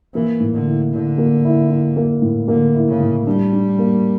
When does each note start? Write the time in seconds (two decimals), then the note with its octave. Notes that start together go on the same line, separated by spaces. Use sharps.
0.14 E3 A#3
0.40 A2
0.54 D3
0.66 E4
0.92 D3 E4
1.18 A#3
1.45 E4
1.70 E4
1.97 A#3
2.22 A2
2.48 D3 A#3
2.75 E4
2.88 C#3
3.00 A2
3.26 G3 D4
3.53 D4
3.78 A#3